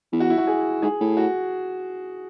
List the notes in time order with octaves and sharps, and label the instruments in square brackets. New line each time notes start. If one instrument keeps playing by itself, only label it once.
[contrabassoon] E2
[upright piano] F#4
E4
F#4
G#4
[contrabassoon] G#2 [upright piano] G#4
[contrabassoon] A2
[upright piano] F#4